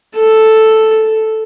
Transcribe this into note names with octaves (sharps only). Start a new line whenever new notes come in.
A4